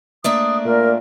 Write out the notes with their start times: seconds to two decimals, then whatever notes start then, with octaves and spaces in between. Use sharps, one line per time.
0.24 A3 A#3 D4 D#6
0.65 A#2 A#4